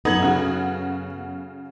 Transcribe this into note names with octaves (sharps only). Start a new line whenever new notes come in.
F#2 B3 D#4 A4 G#6 F#7
C#3 F#4